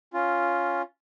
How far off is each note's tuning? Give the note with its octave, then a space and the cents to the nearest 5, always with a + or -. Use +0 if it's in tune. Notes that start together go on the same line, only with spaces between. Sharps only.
C#4 +0 F4 +0